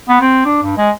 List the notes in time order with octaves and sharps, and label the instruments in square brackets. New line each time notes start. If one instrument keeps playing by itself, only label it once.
[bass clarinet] B3
C4
D4
G2
G#3